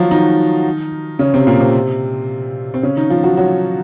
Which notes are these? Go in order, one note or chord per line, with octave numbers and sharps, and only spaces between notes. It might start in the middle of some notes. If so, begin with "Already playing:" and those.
Already playing: D#3 F3 F#3 D#4 F4 F#4
D#3 D#4
C#3 C#4
C3 C4
A#2 A#3
C3 C4
C4
C#3 C#4
D#3 D#4
F3 F4
F#3 F#4
F#3 F#4